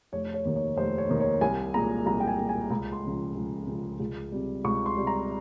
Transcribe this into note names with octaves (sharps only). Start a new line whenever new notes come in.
F1 C#5
C#5
D#2 D#3
C#5
F1 C5
C#5
D#2 D#3
C#5
C2 G#5
A#2 G#3 A#5
C2 A#5
G5
G#5
A#2 G#3
G#5
C#2 A#5
C6
C#3 F3 G#3
C#2
C#3 F3 G#3
C#2
C3 G3
C#2 C#6
C6
C3 G3
A#5